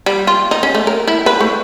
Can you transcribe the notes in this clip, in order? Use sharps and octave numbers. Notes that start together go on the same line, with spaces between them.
G3
F4
D#4
C#4
A3
A#4
E4
B4
A3